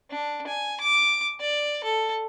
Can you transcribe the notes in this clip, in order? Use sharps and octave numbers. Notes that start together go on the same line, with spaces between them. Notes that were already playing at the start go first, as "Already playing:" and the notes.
D4
G#5
D6
D5
A4